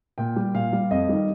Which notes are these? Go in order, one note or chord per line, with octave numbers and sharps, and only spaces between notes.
A#2 G5
G3
A#2 F5
G3
F2 D#5
D#3 G3